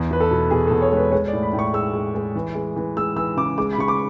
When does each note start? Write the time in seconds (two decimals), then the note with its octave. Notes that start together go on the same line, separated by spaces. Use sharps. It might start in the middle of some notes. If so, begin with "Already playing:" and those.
Already playing: E2
0.11 E2 B4
0.20 A4
0.31 B2
0.51 B2 G#4
0.67 A4
0.71 E2
0.82 C#5
0.92 G#3 B4
1.12 G#3 C#5
1.28 D5
1.33 A2
1.43 B5
1.53 A2
1.59 C#6
1.74 G#3 E6
1.94 G#3
2.15 G#3
2.35 E3
2.55 G#3
2.76 E3
2.97 G#3 E6
3.16 E3 E6
3.37 C#3 D6
3.58 G#3 D6
3.73 B5
3.78 C#3 C#6
3.88 D6